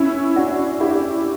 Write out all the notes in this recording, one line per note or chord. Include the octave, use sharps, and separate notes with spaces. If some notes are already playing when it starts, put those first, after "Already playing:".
Already playing: C#4 E4
D4 F#4
E4 G4